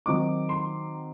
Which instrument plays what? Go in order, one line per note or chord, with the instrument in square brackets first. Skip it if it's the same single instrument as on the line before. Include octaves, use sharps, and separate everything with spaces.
[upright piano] D#3 F#3 C4 D#4 D6
C6